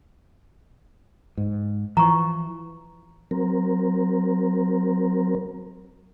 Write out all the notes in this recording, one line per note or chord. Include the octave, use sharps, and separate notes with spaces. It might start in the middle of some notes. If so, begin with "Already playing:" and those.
G#2
E3 F3 A#5 C#6
F#3 C4 A#4